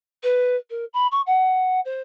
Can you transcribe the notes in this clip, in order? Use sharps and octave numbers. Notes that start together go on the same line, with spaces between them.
B4
A#4
B5
C#6
F#5
C5